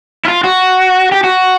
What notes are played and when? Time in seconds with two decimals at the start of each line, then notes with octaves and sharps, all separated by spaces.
0.25 E4
0.28 F4
0.44 F#4
1.12 G4
1.24 F#4